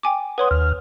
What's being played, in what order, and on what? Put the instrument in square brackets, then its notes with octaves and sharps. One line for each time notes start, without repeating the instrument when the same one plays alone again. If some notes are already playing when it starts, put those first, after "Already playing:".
[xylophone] G5 G#5 D6
[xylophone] B4 C#5 C6 [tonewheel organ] F#5 D#6
[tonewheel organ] D#2 F6